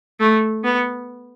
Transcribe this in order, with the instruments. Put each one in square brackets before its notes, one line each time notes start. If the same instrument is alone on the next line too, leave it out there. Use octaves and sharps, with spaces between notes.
[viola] A3
B3